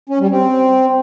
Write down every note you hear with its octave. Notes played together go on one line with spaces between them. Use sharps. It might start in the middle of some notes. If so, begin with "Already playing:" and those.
C#4
G3
C4